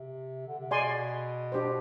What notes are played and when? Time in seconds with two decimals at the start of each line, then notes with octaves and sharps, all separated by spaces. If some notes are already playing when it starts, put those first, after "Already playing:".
Already playing: C3
0.47 D3
0.59 C3
0.71 B2 G#4 D5 G#5 C6
1.52 D4 G4 C5